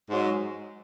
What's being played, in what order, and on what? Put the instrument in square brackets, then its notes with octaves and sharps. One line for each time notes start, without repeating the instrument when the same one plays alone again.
[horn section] G#2 F#3